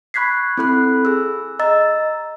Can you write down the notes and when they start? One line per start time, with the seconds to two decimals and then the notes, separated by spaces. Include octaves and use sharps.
0.14 B5 C#6 F#6 G#6 B6 C7
0.57 C4 E4 A4 B5 F#6
1.05 G#4 E6
1.59 D#5 A#5 E6 A6